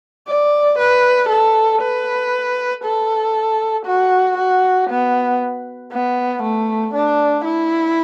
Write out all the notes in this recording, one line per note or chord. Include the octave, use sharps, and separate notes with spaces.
D5
B4
A4
B4
A4
F#4
F#4
B3
B3
A3
D4
E4